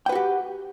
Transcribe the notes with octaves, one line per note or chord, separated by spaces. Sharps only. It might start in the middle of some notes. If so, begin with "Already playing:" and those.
F#4 G4 B4 G5